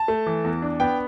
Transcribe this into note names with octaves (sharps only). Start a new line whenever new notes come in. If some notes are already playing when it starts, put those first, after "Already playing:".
Already playing: A5
A3
E3
E2
D4
B3 G5